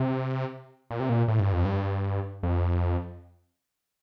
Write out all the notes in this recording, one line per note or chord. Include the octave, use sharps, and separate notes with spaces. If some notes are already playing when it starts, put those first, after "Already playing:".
Already playing: C3
A#2
C3
A#2
A2
G2
F2
G2
F2